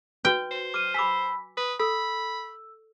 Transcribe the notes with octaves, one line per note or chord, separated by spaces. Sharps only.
F#4 B4 G5
C5
D6 F6 D#7
G#5 B5 D6 E6 B6
B4 D#6
A4 B5 E6